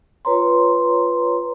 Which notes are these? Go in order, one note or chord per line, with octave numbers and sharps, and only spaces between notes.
F4 B4 C#5 A#5 C6